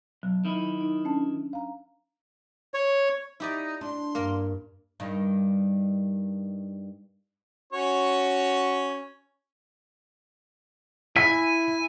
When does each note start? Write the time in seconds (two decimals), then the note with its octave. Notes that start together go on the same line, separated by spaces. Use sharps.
0.23 B1 F#3
0.45 D#3 E4
0.81 D#4
1.05 C#4 D4 A5
1.53 F5 A#5
2.74 C#5
3.40 D#4 E4 G4 D5
3.81 D4 C6
4.15 G2 A#3 A#4
5.00 G2 D#3
7.73 C#4 F#4 C#5
11.16 E4 G#5 B6